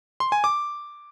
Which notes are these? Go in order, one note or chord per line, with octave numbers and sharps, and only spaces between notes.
C6
G#5
D6